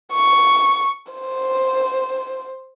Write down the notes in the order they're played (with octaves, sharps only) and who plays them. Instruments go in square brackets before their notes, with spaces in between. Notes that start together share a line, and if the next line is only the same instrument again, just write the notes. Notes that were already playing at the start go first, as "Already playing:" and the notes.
[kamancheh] C#6
C5